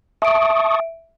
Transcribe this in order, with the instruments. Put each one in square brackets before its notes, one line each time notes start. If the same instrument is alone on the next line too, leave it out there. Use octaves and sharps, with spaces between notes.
[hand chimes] E5 D7 [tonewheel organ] A5 C#6 D#6